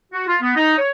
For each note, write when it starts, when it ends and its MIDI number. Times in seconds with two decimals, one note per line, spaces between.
0.13 0.24 66
0.28 0.36 65
0.41 0.56 59
0.56 0.78 63
0.78 0.91 73